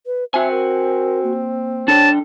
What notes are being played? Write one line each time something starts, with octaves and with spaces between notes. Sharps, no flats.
B4
C4 F#4 E5 G#5
A#4
A#3
D4 A4 C#5 G5 A5